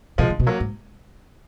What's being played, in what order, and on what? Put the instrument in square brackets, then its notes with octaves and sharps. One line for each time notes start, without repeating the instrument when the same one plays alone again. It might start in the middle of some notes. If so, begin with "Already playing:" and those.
[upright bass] B2 [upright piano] F3 G#3
[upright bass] D3
B2
[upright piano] F#3 A#3
[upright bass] G#2